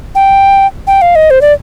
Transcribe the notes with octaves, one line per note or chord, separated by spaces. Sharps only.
G5
G5
F5
D#5
C5
D5